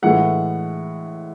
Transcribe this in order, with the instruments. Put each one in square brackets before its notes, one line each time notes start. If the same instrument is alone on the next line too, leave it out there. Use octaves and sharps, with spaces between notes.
[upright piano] A2 E3 G#3 F#5